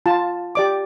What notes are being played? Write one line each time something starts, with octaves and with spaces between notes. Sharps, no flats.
F4 A5
G4 D5 D6